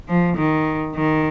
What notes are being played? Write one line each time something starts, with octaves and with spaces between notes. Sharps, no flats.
F3
D#3
D#3